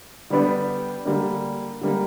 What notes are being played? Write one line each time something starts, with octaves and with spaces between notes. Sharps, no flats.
D3 G3 B3 D4 G4
D3 G3 A#3
D3 G3 A#3